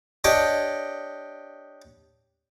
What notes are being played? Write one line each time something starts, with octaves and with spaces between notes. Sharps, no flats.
D4 G4 C#5 D#5